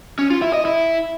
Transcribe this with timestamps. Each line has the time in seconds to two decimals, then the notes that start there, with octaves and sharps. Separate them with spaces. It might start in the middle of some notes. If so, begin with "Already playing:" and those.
0.19 C#4
0.30 F4
0.42 E4
0.54 D#5
0.65 E4